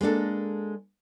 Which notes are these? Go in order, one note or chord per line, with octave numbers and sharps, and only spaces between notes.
G#3 A#3 D4 A4